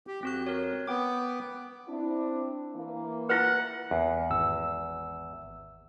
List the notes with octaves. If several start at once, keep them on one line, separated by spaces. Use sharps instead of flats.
G4
F2 C4 F#4 F#6
A#4 C#5
B3 G5 D6
C4 D4 E4
E3 A#3
E4 F4 B4 F#5
E2
G#1 E6